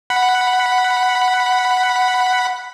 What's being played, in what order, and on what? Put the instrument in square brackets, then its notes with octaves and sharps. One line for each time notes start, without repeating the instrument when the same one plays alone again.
[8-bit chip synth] F#5 B5